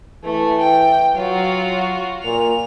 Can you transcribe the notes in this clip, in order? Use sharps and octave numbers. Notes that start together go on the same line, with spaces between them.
E3 A3
G5
F#3 F4 F#4
A#2 F7